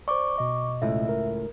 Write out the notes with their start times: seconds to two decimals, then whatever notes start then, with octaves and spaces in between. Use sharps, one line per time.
0.08 C5 D5 C#6 D6
0.38 B2 D#5
0.82 C#2 A2 E5
1.09 A#4